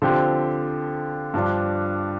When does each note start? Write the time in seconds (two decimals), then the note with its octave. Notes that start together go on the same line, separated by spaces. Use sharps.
0.02 D3 F3 C4 G4
1.34 G2 F3 D4